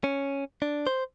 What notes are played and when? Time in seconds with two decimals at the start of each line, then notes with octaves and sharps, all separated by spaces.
0.04 C#4
0.62 D4
0.87 C5